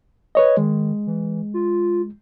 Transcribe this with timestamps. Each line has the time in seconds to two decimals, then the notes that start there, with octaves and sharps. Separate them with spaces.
0.35 B4 C#5 D#5
0.57 D#3 G#3
1.07 E3
1.54 F4